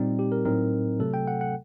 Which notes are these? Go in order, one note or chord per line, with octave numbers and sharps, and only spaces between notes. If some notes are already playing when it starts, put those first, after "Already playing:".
Already playing: A#2 G3 C4 D#4
G4
A#4
A2 F#3 C4 D#4 A#4
C3 F#3 A3 A4
G5
F#5
F#5